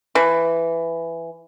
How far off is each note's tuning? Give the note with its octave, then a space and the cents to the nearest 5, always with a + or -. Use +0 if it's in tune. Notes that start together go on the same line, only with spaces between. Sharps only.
E3 +10